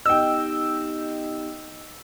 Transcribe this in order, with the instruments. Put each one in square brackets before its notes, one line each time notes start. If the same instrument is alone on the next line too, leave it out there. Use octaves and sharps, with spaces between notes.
[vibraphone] B3 D#4 G4 [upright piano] D#5 G5 [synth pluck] E6